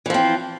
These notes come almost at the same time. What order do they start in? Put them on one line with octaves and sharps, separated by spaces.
E3 F3 C4